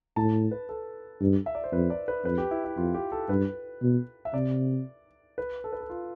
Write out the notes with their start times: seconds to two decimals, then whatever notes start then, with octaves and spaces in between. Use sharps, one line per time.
0.16 A2 A5
0.51 B4
0.69 A4
1.21 G2
1.46 E5
1.55 D5
1.64 C5
1.72 F2 B4
1.90 D5
2.08 B4
2.25 F2 B4
2.38 G4
2.51 E4
2.64 E4
2.77 F2 F4
2.94 G4
3.12 A4
3.29 G2 B4
3.82 B2
4.25 E5
4.34 C3 D5
5.38 B4
5.64 A4
5.73 B4
5.81 A4
5.90 F4